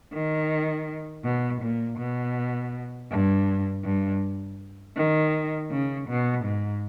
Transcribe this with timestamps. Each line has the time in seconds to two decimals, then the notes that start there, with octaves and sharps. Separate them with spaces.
0.14 D#3
1.24 B2
1.62 A#2
1.99 B2
3.11 G2
3.84 G2
4.96 D#3
5.71 C#3
6.08 B2
6.45 G#2